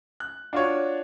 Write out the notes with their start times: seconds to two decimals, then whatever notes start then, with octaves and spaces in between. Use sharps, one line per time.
0.20 F#6
0.53 D4 F4 F#4 C#5